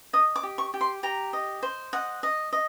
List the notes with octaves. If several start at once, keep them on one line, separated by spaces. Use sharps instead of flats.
D#5 D#6
D6
G4
C#6
G4
C6
G4 A#5
D#5
C5
D#5 F#5
D#5
D#5